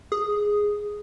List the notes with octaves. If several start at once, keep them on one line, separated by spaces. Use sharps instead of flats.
G#4